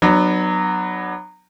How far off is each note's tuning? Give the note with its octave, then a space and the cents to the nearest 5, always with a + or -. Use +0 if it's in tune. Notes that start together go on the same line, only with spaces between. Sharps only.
F#3 +0 B3 +0 D4 +40